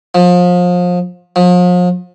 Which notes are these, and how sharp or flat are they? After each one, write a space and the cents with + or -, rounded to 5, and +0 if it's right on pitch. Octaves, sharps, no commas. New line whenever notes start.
F3 +30
F3 +40